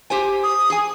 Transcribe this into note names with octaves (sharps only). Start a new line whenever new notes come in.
G4 C5 G#5
D#6
G#4 G#5